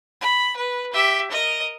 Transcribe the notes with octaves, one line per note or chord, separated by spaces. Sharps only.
B5
B4
G4 E5
A#4 D#5